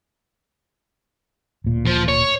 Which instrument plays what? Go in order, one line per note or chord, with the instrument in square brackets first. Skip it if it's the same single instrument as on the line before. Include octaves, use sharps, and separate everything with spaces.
[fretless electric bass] D1 A#2
[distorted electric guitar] F3
C#5